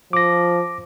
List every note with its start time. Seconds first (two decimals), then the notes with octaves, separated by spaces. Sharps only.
0.13 F3 D6 A#6